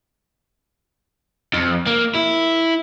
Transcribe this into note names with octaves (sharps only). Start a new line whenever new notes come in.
F2
A#3
E4